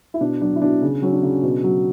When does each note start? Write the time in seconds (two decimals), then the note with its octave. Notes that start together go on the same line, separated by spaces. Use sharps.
0.14 E4
0.21 B2 D4
0.41 F#3 D4
0.56 E4
0.62 B2 D4
0.82 C#3
1.02 F#3 C#4
1.13 D4
1.23 C#3
1.43 B2
1.64 F#3